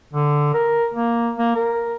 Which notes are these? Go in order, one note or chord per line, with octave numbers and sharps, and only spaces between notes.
D3
A#4
A#3
A#3
A#4